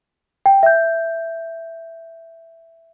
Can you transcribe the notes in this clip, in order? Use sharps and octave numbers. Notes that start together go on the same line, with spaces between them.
G5
E5 G6